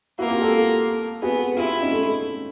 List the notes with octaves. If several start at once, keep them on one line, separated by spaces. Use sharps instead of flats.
A#3 E4 F#4
F4 G4
G4 A4
B3 F#4 G#4
E4 F4 G4
C#4 D#4
A3